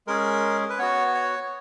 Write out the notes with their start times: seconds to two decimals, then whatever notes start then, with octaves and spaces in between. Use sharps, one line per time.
0.07 G#3 C#4 G#4 A#4
0.70 B4
0.79 B3 F#4 C#5
1.14 C#5